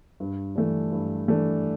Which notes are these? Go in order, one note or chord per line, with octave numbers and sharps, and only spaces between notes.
G2
E3 A3 D4
G2
E3 A3 D4